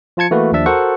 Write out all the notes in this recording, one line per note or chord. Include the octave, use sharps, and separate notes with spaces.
F3 F4 A5 G#6 C#7
E3 A3 A#3 F#4 B4
D#2 F3 D4 E5 A5
F#4 A4 A#4 C5 F#5 C#6